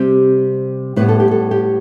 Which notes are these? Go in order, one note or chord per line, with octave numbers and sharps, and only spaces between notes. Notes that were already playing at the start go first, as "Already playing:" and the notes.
Already playing: C3 G3 C4 G4
A2 G3 B3 B4
A4
G4
A4
G4